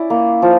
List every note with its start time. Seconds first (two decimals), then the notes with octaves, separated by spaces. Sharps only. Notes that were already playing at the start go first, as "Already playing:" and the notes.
Already playing: C#4 E4 D5
0.10 A#3
0.42 F3